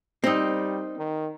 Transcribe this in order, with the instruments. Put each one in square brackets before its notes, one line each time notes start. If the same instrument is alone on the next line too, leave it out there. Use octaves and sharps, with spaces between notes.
[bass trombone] G3 [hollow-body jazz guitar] C4 [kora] D#4 A#4
[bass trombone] D#3